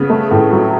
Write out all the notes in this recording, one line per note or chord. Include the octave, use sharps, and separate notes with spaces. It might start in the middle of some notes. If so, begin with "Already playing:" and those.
Already playing: C#3 B3
A3
A2
F#3